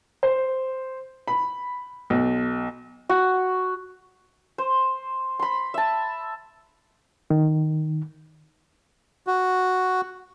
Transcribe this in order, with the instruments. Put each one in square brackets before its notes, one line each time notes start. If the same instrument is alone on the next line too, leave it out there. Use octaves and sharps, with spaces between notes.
[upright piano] C5
B5
B1
[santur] F#4
C5
B5 C6
E5 A5
[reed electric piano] D#3
[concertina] F#4